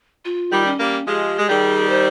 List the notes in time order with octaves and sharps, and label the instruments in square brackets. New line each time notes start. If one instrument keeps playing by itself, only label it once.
[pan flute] F4
[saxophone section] D#3 G3
[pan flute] C#4
[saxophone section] G3 A#3
[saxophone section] F3 G#3 [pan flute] G4
[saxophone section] G#3
[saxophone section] D#3 G3 [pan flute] G#4
[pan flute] C5